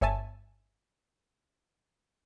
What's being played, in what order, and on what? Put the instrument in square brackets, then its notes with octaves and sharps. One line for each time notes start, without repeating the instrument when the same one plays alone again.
[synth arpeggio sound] G1 C#5 E5 G#5 A5